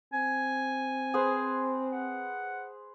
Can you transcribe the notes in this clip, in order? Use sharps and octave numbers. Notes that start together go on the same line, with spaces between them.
C4 G#5
G#4 B4 C5
F#5